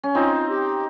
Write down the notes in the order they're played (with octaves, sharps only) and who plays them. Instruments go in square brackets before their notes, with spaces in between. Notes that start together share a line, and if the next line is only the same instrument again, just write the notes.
[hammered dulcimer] C#4
[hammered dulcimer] C4 D#4 [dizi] F4
[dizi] G4